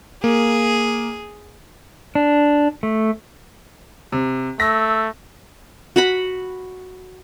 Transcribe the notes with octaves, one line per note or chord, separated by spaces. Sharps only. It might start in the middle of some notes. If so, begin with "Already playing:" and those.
A#3 G#4
D4
A3
C3
A3 E6 A#6
F#4 F#5 B5